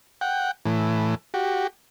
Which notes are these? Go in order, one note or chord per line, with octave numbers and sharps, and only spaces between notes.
F#5 G5
A2 E3
F#4 G4